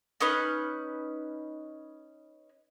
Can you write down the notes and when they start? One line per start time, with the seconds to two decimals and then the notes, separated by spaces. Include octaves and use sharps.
0.21 C#4 D#4 B4 F6